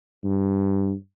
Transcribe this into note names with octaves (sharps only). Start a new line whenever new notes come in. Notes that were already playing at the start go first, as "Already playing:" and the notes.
G2